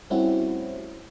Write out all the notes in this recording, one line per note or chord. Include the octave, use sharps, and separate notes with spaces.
G3 A3 C4 C#4 E4 F#4